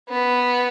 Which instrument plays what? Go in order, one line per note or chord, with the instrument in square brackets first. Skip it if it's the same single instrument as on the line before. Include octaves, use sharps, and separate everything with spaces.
[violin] B3